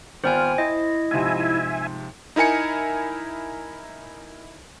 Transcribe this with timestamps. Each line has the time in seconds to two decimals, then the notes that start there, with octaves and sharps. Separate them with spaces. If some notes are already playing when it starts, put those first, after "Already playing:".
0.24 G#1 B3 F4 C5 G5 G#5 F6
0.58 E4 C5 D#5
1.11 G#2 C3 F3 E5 G#5
2.36 D#4 E4 A#4 G#5 C#7